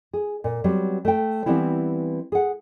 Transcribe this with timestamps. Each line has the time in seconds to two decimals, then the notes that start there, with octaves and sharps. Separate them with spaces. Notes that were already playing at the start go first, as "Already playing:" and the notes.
0.13 G#4
0.44 A#2
0.64 F#3 G3 B3 C4
1.05 A3 G5
1.46 E3 G3 B3 C4 E4
2.32 G#4 F#5